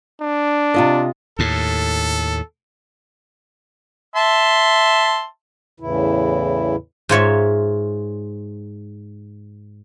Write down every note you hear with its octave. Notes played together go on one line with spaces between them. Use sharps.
D4
C3 F4 D#5
D#2 A2 A4
E5 A5 C6
E2 A2 C#3 E3 E4
G#2 F4 C#5 E5